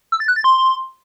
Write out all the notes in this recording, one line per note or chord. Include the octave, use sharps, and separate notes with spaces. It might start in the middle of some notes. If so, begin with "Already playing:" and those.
E6
A6
F#6
A6
C6